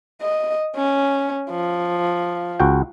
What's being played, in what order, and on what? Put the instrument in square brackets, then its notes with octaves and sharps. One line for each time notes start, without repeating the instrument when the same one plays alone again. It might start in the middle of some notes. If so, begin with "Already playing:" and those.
[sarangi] D#5
C#4
F3
[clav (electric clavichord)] C#2 F#4 G5